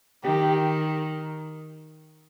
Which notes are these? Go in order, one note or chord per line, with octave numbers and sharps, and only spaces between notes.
D#3 G4